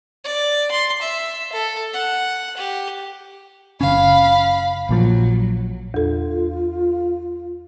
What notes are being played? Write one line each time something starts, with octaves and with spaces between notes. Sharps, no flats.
D5
C6
E5
A4
F#5
G4
F#1 C#3 C#4 F5 B5
A#1 A#2 F3 F#3
E2 F4 A4